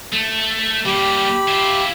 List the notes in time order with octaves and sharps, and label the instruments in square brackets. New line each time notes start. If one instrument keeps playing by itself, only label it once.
[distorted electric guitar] A3
[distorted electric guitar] G3 A#3 [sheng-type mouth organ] G4 B5
[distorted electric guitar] E4 F4